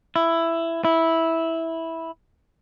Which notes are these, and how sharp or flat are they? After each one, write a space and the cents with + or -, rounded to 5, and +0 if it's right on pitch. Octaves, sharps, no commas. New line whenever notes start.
E4 +10
E4 -10